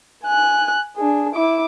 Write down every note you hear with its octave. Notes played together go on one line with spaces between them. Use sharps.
G#5 F#6
D4 G#4
E4 D6